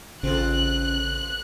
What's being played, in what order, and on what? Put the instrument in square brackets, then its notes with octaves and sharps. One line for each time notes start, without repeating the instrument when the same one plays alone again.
[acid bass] A1 [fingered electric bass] C#3 [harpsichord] C4 F4 A4 [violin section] F#6